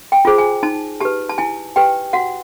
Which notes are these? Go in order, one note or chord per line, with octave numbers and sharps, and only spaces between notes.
G5
F4 G#4 C5
G#5
D#4 A5
G4 B4 A5
A5
E4 G#5
G4 B4 G5
F#4 F#5